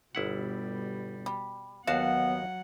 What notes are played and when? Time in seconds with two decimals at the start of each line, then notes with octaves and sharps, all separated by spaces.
0.15 G1 B2 G3 E4 F#5
1.26 G3
1.87 D#2 F#3 B3 F#4 F5 F#5 A5